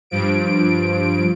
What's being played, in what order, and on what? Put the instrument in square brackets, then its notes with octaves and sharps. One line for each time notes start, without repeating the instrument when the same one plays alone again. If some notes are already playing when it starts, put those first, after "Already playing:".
[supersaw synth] G2 F3 D7